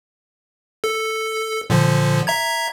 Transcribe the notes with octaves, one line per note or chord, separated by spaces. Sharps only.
A4
A#2 D3 F3
E5 A#5 G#6